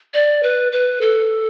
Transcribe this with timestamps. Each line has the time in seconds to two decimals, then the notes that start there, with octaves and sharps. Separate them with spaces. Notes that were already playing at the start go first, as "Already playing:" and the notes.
0.14 D5
0.43 B4
0.72 B4
1.01 A4